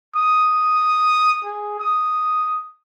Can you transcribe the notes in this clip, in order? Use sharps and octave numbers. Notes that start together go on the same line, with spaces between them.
D#6
G#4
D#6